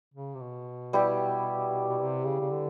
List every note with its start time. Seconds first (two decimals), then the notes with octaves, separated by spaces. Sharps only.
0.14 C#3
0.35 C3
0.40 B2
0.93 G3 B3 E4 G4
1.98 C3
2.25 C#3
2.40 C#3
2.51 D3